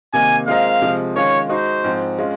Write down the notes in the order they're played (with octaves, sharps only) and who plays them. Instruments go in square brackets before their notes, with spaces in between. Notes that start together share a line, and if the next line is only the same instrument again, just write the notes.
[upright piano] C3 D#3 A#3 [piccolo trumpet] G#5
[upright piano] G#3 C4 F4 A#4 D#5 [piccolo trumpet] F5
[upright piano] C3 F3 G#3
[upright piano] D#3 G#3 C#4 F4 [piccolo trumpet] C#5
[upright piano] G#3 D#4 F#4 [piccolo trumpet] C5
[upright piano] G#2 F3 C4
G#3 C#4 F4